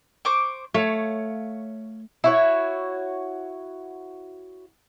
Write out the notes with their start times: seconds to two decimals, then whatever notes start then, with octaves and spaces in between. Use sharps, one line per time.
0.25 C5 C#6 D6
0.74 A3 C#5 F5
2.24 E4 F#4 C#5